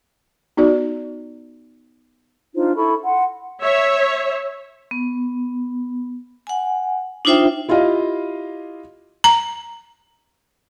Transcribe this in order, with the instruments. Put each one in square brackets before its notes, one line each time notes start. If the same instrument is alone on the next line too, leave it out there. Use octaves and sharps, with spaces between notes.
[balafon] B3 D#4 F#4 D5
[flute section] D4 D#4 F4 C5
E4 A4 B5 C#6
F#5 C6
[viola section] C#5 E5
[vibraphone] B3
F#5 G#5
D4 D#4 F4 C5 E5 G5
[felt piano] E4 F4 G4 D#5 F5
[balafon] A#5